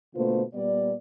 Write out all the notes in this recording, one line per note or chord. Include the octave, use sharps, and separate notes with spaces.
B2 D3 A3 A#3 F4 C5
A#2 G3 B3 D5